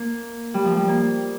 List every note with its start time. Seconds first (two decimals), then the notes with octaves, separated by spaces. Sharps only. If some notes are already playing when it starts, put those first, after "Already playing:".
Already playing: A#3
0.54 G3
0.65 F3
0.77 G3
0.88 A#3